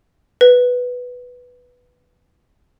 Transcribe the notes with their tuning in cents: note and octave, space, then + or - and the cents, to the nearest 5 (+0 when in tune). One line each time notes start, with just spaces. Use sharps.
B4 +0